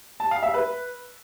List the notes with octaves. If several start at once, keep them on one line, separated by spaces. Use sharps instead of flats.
A5
F5
E5
B4